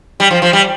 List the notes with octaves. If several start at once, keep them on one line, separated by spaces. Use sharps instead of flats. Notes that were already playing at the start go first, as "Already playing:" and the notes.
G3
F3
F3
G3